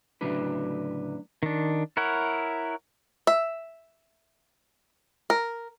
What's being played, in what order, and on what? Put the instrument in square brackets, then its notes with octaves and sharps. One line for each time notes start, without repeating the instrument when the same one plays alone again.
[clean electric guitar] D2 A2 C#3 F#3 D4 B4
[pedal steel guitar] D#3 D4
E4 A#4 C#5 F#5
[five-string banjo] E5
A#4